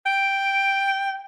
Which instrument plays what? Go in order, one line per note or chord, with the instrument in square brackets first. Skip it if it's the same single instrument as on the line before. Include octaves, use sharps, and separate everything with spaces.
[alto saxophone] G5 [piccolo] D7